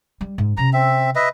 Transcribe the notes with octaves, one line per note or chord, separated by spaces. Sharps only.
G3
G#2
C3 C#4 A#5
C4 E5
B4 D#5 E5